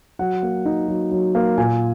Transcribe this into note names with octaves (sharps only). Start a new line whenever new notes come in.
F#3 F#5
A#3
D#4
F#3
F#3
A#3
A#2 G#5